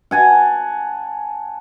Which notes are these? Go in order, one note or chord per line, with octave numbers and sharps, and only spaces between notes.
F#5 G#5 A5